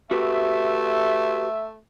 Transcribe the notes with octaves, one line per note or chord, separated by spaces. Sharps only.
A3 F#4 G4 B4 E5